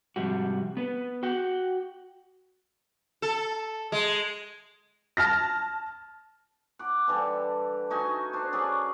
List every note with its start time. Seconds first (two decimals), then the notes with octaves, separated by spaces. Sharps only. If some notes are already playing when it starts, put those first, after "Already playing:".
0.16 G#2 C3 F3 G3 F#4
0.77 B3 B4
1.23 F#4 F#5 G5
3.22 A4
3.92 G#3
5.17 A5 F6 A#6
6.79 F#5 D6
7.08 D3 E3 G3 A4
7.90 A3 D#4 F#4 G#5
8.33 D4 C5
8.52 F#3 C#4 G#4 D5